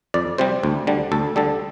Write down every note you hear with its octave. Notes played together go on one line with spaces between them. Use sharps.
F2 D5
C3 G3 C5
D2
D3 G3
D2 A4
D3 G3 A4